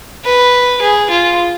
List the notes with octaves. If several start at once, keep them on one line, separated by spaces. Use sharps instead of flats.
B4
G#4
F4